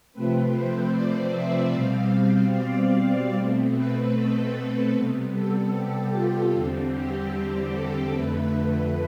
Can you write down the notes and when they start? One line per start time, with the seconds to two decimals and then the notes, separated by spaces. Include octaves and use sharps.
0.13 C3 F3 A3 C4 B4
0.53 C5
0.93 D5
1.33 E5
1.73 B2 G3 C4 F5
2.13 F5
2.53 D5
3.33 B2 A3 C4
3.73 B4
4.13 A4
4.93 C3 G3 B3
5.33 A4
5.72 G4
6.13 F4
6.53 E2 D3 G3 C4
6.92 G4
7.73 A4
8.12 F2 D3 A3 B4
8.53 B4